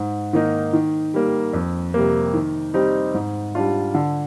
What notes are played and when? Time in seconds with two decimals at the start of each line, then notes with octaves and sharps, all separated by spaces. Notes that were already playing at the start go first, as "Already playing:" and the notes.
Already playing: G#2
0.33 D#3 A#3 D#4
0.73 D#3
1.14 G3 A#3
1.53 F2
1.94 C3 G3 A#3
2.34 D#3
2.74 G3 C4 D#4 G4
3.14 G#2
3.55 G3 D4 F4
3.94 D3